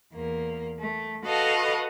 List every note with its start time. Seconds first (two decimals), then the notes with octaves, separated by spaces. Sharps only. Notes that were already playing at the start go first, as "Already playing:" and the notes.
0.12 E2 A#3
0.78 A3
1.24 F#4 A4 B4 D#5 F5